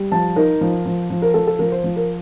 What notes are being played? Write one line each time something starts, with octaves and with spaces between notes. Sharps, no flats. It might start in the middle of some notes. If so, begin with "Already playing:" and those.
Already playing: G3
F3 A5
D#4 A#4
F3
F3
F3
A#4
F3 A4
A4
F3 A#4
C5
F3
A#4